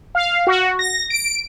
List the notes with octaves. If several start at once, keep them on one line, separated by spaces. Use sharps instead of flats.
F5
F#4
A#6
D7